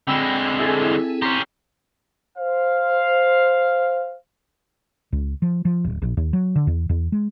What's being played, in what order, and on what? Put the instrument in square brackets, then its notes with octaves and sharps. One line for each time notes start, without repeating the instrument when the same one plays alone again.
[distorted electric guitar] D3 G#3 [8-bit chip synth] C4 [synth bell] G5 B5 E6
[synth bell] E4 G#4 A4
[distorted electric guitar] C#4 G4 [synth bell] A#5 C6
[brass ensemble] C5 F5
[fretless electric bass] C#2
F3
F3
D1
A#1
D#2
F#3
D3
E2
E2
G#3